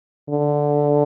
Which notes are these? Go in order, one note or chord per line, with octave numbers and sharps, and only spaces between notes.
D3